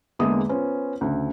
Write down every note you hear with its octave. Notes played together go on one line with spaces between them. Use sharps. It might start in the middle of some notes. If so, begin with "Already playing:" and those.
E2 D3 G#3 A#3 E5 D#6
B3 C#4 F4 C5
D2 C#3